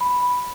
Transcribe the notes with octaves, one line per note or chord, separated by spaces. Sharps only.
B5